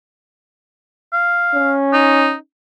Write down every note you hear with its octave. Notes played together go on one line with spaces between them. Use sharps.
F5
C#4
D#4